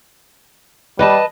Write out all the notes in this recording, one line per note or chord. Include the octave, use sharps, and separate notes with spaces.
G3 B4 D#5 A5